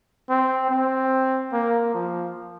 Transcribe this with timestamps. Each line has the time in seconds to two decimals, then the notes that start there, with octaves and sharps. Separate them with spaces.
0.29 C4
0.71 C4
1.53 A#3
1.94 F3